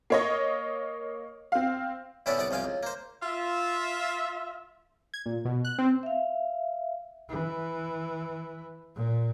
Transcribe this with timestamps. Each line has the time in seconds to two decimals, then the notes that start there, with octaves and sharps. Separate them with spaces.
0.10 A#3 C#5 D#5
1.52 C4 F5
2.26 A2 D3 B3 C#4 D5 E5
2.38 C2 B3 D5 D6
2.51 C2 F3 F5 G#5 D6
2.64 C#2
2.83 A#3 C5
3.23 F4 E5
5.14 G#6
5.26 A#2
5.45 B2
5.65 F#6
5.78 C4
6.03 E5 F5
7.29 E3
8.95 A#2